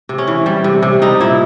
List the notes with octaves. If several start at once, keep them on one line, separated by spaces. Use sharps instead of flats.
C3
C#4
E3
G3
C3
C3
G3 D#4
A#2 E4